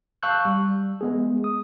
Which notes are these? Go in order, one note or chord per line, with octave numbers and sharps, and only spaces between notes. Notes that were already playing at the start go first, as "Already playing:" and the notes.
F5 A5 C#6 E6 F#6 G6
G3
G#3 B3 G#4
D#6